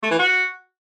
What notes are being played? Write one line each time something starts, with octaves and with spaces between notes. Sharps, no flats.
A3
E3
F#4